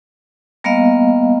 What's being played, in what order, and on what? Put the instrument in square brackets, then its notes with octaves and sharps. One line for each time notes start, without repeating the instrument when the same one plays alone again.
[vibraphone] G3 A#3 B3 D#5 F5